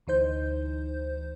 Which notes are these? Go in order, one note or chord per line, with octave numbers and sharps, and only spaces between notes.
D2 E3 D#4 C5 G6